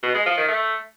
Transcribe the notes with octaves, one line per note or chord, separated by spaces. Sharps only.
B2
G#3
F3
D#3
A3